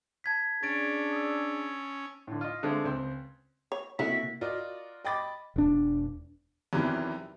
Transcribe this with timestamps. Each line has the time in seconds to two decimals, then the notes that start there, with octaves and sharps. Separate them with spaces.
0.24 A5 G#6 B6
0.63 C#4 D4 G#4 A6 D7
1.12 D#6 E6
2.27 A2 D3
2.41 F4 D#5
2.63 D3 G#3 A3 C4
2.85 C#2 C4
3.72 C#5
3.99 C3 D#3 A3 A#3 C#4 E4 F#4 B6
4.41 F4 F#4 A#4 D5 D#5
5.04 D#5 G5 B5 D6 A6
5.56 E1 D4
6.73 E2 C3 D#3 E3 F#3